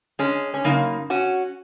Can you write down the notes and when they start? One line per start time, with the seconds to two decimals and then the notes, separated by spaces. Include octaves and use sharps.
0.19 G#3 C#4
0.54 C#4
0.64 F#2 C#3 A#3 D#4
1.10 C#4 F#4